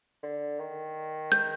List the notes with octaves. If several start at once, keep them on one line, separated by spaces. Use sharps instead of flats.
D3
D#3
G6